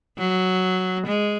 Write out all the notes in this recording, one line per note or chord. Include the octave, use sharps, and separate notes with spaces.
F#3
G#3